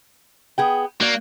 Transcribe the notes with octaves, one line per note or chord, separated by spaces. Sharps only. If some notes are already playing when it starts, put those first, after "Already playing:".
B3 G#4 G5
A#3 F#4 D5